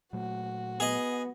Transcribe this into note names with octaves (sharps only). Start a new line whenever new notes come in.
A#2 F#3 A3 F#4
B3 G#4 D#5